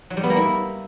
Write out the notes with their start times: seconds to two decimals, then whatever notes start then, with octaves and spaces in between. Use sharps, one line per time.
0.10 F#3
0.17 G3
0.23 B3
0.30 A#3
0.36 E4